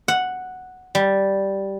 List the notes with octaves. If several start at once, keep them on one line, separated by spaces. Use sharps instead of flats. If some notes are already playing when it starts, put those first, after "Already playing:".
F#5
G3